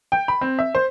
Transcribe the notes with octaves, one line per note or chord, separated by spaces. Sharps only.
G5
B5
C4
E5
C5